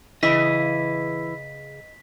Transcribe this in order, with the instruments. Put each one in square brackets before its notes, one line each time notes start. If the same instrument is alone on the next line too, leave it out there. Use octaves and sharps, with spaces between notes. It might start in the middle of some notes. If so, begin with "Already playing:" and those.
[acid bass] C#3 [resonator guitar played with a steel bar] E3 [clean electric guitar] D#5 [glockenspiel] B6